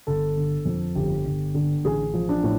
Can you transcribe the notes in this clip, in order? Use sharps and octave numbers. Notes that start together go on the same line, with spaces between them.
G1 A4
D3
F2
G1 G4
G1
D3
A1 G#4
F3
D4
A2